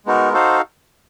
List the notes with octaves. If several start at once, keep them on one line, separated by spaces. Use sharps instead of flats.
G#3 B3 D#4 F#4 A#4
D#4 F#4 A4 C5 F5